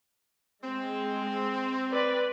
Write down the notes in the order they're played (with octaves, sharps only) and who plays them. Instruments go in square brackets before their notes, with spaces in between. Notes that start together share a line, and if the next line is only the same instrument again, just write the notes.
[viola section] G#3 [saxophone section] C4
[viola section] B4 D5